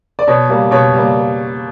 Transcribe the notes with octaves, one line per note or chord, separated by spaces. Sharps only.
D5
B2 C#5
G3 A#3
B2 C#5
G3
A#3